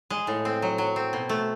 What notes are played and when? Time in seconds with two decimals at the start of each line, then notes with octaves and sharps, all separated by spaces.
0.10 G#3
0.27 A2
0.45 C4
0.62 F#3
0.78 F#3
0.96 C4
1.13 B2
1.29 A3